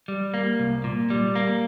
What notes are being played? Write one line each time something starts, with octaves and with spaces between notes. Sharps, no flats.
G3
A#3
C2
A#2
G3
A#3